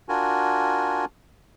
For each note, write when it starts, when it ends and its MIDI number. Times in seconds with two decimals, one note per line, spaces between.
0.09 1.05 62
0.09 1.05 65
0.09 1.05 66
0.09 1.05 70
0.09 1.05 80